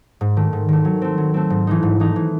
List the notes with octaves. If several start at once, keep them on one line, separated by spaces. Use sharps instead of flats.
G#2
D#3 A3
G#2
D#3 A3
F#3
A3 C4
F#3
A3 C4
G#2
E3 A3 D#4
G#2
E3 A3 D#4
E3